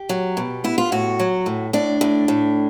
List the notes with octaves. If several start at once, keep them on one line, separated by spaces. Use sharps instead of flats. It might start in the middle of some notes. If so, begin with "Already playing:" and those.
Already playing: G4
F#3
B2
B3 E4
F4
A2 F#4
F#3
A2
A2 D4
A2
A2